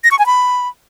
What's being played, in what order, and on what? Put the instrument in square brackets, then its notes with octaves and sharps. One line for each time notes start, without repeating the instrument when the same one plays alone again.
[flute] A#6
C#6
G#5
B5